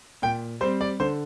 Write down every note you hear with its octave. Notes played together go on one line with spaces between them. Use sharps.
A#2 G5
G3 C4 C5
D5
D3 C5